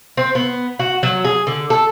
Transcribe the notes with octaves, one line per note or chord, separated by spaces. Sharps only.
C4
B3
F#4
F#3
G#4
D3
A4